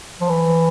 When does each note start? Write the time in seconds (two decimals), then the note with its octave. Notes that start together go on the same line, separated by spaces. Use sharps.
0.21 F3
0.29 E3